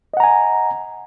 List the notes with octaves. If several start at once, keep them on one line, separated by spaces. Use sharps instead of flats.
D#5 F#5 G#5 A#5